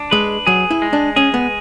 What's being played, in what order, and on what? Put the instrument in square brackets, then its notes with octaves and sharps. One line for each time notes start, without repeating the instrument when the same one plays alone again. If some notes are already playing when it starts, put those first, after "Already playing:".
Already playing: [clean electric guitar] D4
[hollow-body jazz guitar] G#3 [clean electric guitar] B4
[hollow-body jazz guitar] F#3 [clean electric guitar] G#4
[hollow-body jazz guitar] E4
[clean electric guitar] G#3
[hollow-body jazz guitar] D4
[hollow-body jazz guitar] C#4 [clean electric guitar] G#4
[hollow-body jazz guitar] B3